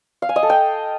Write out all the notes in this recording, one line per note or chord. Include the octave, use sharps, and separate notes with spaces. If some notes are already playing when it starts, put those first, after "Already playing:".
F5
G#5
D#5
A4
G5